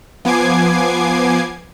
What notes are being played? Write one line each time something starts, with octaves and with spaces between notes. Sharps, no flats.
F3 B3 G#5 D6 G#6 C7